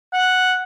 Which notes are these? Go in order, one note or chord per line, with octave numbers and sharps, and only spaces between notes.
F#5